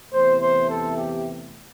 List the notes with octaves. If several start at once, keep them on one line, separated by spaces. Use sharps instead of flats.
E2 C3 E3 A3 C5
C5
A4
G4